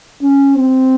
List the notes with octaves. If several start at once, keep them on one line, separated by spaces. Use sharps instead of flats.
C#4
C4